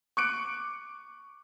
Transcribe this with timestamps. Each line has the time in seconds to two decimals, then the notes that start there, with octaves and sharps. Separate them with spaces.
0.17 C#6 D6 F#6 C#7 D7